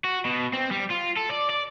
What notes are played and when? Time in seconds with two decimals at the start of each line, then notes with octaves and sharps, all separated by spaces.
0.04 F#4
0.25 B2
0.53 C4
0.71 G3
0.90 F4
1.16 A4
1.30 D5
1.49 D5